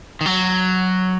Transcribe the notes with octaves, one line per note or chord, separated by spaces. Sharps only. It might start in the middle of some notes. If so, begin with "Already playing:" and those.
D#3
F#3